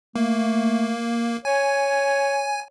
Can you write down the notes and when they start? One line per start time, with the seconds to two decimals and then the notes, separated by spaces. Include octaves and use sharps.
0.16 A3 A#3
1.45 C#5 G#5